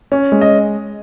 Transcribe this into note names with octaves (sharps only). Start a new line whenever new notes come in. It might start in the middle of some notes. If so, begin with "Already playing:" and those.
C#4
G#3
D#5